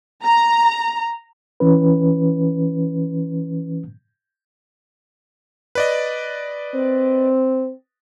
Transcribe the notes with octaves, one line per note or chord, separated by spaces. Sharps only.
A#5
E3 C#4 B4
B4 D5 D#5
C4